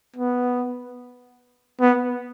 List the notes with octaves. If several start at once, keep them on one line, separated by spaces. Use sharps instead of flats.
B3
B3